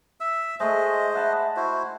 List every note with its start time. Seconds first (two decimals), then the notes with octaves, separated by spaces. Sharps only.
0.20 E5 E6
0.60 G#3 A3 C5 D#5 E5
1.15 F#5 A5 B5
1.56 E4 F#4 C5